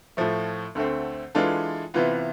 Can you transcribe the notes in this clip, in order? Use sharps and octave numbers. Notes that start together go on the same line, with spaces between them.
A2 F3 A3
D2 D3 A3 C4
E3 G#3 D4 F4 A4
C3 E3 B3 F4